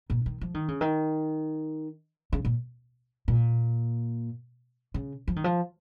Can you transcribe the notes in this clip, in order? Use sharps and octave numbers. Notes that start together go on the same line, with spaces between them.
A#2
D#3
F3
D#3
C#3
D#3
C#3
A#2
A#2
C#3
F3
D#3
F3